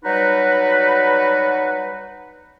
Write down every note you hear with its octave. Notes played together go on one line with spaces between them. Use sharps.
F#3 G3 D#4 F#4 B4